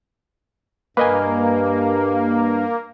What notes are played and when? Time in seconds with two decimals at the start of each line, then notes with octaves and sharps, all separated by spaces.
0.97 G2 A#3 B4 D#5 G#5